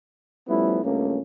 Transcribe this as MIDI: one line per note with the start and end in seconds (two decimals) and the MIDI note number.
0.48 0.79 53
0.48 0.79 55
0.48 0.79 57
0.48 0.79 59
0.48 0.79 61
0.48 0.79 64
0.83 1.20 37
0.83 1.20 43
0.83 1.20 57
0.83 1.20 58
0.83 1.20 61